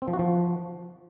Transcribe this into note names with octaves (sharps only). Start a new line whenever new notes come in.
C4
F3
F#4
F3